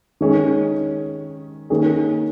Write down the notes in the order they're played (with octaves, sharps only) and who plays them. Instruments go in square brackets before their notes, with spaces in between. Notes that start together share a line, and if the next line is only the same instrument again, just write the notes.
[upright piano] D#3 G#3 C#4 G#4
D#3 A#3 C#4 G#4